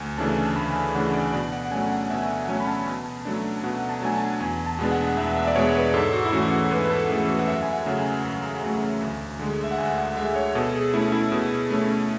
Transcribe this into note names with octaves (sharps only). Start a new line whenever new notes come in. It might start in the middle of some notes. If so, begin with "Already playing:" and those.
Already playing: D2 G#5
C#3 E3 A3 D4 A5
A5
D2 B5
G#5
A5
C#3 E3 A3 D4 F#5
D5
B2 D5
F#5
F#5
F#3 A3 C#4 G#5
F#5
B2 E5
G#5
F#5
F#3 A3 C#4 G#5
B5
A5
B2
F#3 A3 D4
B2 F#5
A5
F#3 A3 D4 G#5
A5
E2 G#5
A5
B2 G#3 B3 D4
F#5
E2 E5
E5
D5
B2 G#3 B3 D4 C#5
B4
G#2 A4
F#4
E4
E3 A3 C#4 F#4
F#4
G#2 B4
B4
A4
E3 A3 C#4 G#4
F#4
F#5
F#2 E5
G#5
F#5
C#3 F#3 A3
G#5
F#2
C#3 F#3 A3
D2
D3 G#3
E5
F#5
D2 G#5
F#5
D3 G#3 E5
C#5
B2 A4
G#4
A3 C#4 E4
E4
B2
A3 C#4